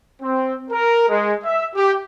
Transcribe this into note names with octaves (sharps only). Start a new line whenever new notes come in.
C4
A#4
G#3
E5
G4